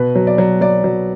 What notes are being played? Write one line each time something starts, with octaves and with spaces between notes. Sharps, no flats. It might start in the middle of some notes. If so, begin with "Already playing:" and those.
Already playing: B2 B4
F#3
D5
F#3
F#3 D5
F#3